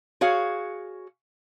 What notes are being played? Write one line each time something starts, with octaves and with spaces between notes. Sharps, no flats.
F#4 G#4 C#5 F5